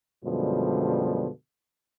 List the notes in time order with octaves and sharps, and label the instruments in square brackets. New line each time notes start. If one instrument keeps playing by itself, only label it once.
[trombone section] F#2 B2 D3 F3 G3 G#3